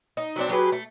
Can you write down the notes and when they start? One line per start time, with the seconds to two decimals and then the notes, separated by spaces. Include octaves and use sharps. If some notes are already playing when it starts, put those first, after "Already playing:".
0.17 D#4
0.36 F#3 B3 C4 D4
0.49 F#3 G4 G#4 B4
0.72 A3